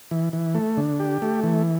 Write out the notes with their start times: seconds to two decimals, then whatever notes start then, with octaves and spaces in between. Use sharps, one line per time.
0.11 E3
0.33 E3
0.55 A3
0.77 D3
1.00 G4
1.22 A3
1.44 E3